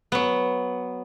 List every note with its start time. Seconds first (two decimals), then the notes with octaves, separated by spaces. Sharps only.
0.12 F#3 B3